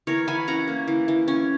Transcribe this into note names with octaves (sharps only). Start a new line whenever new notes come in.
E3 A#4 C#5
E3 G#5 B5
C#4 F#5 A#5
A#3
E3
E3
C#4